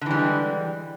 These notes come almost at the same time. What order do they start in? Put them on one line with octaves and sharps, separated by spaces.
D3 E3 G3 G#3